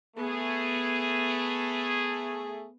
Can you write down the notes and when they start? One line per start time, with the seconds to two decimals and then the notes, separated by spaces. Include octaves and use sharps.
0.17 A3 B3 G#4